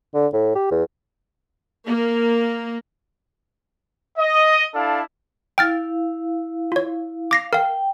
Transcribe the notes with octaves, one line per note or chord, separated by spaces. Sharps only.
D3
A2
G4
E2
A#3
D#5
D4 E4 A4 F5
E4 F5 G5 F6 A6
F4 C#5
F5 D6 A#6 C7
A#4 F5 G5